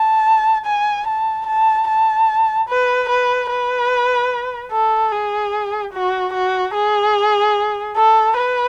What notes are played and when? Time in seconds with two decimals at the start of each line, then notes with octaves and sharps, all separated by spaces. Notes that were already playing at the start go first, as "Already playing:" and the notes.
Already playing: A5
0.66 G#5
1.07 A5
1.46 A5
1.87 A5
2.69 B4
3.09 B4
3.50 B4
4.72 A4
5.12 G#4
5.93 F#4
6.34 F#4
6.74 G#4
7.96 A4
8.36 B4